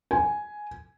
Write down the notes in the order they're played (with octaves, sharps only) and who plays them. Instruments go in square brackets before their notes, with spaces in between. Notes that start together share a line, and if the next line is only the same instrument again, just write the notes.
[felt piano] G#5